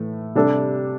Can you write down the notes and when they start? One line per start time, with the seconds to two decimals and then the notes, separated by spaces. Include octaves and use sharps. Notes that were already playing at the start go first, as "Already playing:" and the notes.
Already playing: A2 E3 A3
0.35 C3 G3 D4 A4